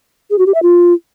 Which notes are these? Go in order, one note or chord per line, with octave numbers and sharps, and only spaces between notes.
G#4
F#4
G4
E5
F4